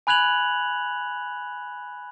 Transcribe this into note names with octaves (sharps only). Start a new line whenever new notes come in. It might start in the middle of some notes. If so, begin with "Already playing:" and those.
G#5 B5 F#6 G#6 F7 F#7